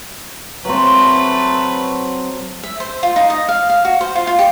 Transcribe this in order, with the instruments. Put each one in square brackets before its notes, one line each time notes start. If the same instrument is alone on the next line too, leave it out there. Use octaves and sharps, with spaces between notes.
[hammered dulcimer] F#3 C4 [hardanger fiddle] A3 B4
[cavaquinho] E5
C5
F4
D#4
D#5
F5
F5
F#4
C5
F4
F4
G4